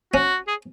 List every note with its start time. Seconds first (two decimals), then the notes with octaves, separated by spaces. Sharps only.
0.13 C#4 F#4
0.48 G#4